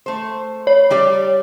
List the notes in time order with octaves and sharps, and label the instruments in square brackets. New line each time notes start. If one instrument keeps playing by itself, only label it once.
[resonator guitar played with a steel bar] A3 C5
[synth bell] C#5
[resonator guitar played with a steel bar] G3 G4 D5